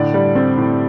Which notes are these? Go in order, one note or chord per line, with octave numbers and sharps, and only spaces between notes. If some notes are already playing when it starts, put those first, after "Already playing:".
Already playing: A2 D3 D5
G3
C4
A2